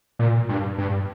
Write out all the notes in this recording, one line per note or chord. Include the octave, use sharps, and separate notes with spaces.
A#2
G2
G2